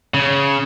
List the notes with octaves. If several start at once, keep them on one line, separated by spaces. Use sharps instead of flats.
C#3